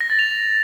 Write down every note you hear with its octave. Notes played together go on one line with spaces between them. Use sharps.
A#6
A6
F7